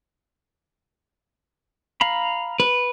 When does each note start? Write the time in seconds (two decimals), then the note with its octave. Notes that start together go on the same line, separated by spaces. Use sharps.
2.01 F5 A#5 B5
2.60 B4